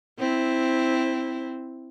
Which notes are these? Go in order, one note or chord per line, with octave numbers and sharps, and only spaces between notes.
C4 E4